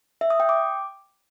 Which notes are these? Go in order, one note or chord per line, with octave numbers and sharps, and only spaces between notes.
E5
D#6
G5
D6